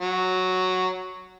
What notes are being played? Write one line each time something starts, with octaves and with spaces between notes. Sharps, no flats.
F#3